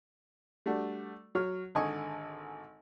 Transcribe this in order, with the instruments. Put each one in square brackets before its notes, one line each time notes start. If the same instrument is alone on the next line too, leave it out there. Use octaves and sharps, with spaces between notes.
[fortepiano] G3 A3 D4 F#4
F#3 C#5 F6
G#1 D3 A4 D#5 G#5 C#6